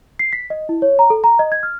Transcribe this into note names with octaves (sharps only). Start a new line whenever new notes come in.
C7
B6
D#5
E4
C#5
A#5
A4
A#5
D#5
G#6
F6